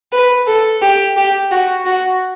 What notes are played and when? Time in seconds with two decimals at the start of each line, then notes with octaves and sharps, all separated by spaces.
0.12 B4
0.46 A4
0.81 G4
1.16 G4
1.51 F#4
1.86 F#4